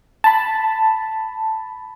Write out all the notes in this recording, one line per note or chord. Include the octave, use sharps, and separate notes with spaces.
A5 B5